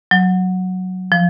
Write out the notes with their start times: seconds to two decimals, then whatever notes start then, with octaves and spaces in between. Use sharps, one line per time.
0.11 F#3
1.12 F3